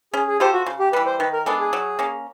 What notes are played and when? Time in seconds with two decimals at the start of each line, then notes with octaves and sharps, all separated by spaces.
0.13 C#4 G#4
0.28 G#4
0.40 F4 G4 A4 C5
0.53 F#4
0.66 C#3
0.79 G4
0.93 E3 G3 B4
1.06 C5
1.19 D#3 B4
1.33 A#4
1.46 G#3 B3 D4 A4
1.60 G#4
1.73 F#3
1.99 A#3 C#4